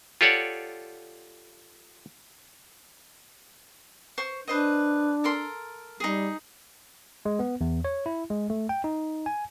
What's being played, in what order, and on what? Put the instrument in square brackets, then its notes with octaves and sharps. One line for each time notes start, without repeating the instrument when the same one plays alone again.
[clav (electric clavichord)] F4 G4 A4 C#5 D5 F#5
[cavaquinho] C5 C#6
[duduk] D4 [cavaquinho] B4 C5 D#5
[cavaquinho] A4 A#4 C6
[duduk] G3 [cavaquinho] D#4 G#4
[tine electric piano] G#3
B3
E2
C#5
E4
G#3
A3
G5
D#4
G#5